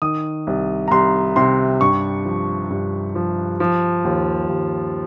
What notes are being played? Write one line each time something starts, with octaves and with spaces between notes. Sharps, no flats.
D#3 D#6
C2
A#5
C2 C6
C3 C6
G2 C#6
F3
G2
F3
F3
D#2
D#2